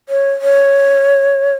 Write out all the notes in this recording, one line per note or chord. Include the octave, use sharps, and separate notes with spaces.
C#5
C#5